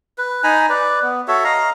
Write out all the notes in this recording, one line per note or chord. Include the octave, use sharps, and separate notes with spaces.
B4
D#4 G#5 A#5 B5
B4 D5
B3
F#4 A4 C#5 E5
D#5 F5 A#5